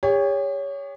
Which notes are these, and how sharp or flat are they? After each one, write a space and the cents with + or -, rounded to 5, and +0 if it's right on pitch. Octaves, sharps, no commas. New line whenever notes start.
G4 +45 C#5 +15